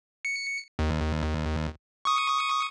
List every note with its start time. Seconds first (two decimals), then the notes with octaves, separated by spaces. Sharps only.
0.25 C#7
0.79 D#2
2.05 C#6 D#6